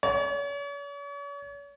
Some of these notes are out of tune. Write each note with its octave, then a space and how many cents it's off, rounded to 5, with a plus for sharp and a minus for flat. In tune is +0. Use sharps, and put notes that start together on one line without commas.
C#5 +40